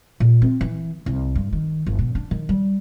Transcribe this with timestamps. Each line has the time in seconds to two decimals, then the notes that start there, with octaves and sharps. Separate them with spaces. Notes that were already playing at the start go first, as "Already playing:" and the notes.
0.20 A#2
0.42 C4
0.61 E3
1.06 C2
1.35 G2
1.53 D#3
1.86 G1
1.99 B2
2.15 D4
2.31 D#3
2.49 G3